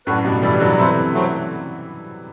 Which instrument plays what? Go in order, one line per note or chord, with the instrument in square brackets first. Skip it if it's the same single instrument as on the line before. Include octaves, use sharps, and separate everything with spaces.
[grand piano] F#2 A2 [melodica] D4 F#4 B4
[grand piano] G2 B2
[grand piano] E3 G3 [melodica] E4 A4 D5
[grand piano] D3 F#3
F#3
[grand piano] C3 E3 [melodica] E4 A4 C5
[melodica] F#3 A3 C4